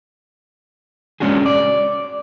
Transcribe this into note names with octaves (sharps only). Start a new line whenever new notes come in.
G#3 C#4 D4 F#4 G#4
D5